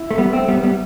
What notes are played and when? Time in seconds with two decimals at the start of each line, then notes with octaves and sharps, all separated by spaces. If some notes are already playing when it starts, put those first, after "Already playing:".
Already playing: E4
0.11 A3
0.18 G3 B3
0.33 A3 C4
0.48 G3 B3
0.63 G3 B3